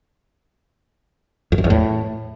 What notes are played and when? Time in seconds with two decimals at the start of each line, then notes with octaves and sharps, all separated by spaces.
1.52 F2
1.58 F#2
1.64 E2
1.70 A2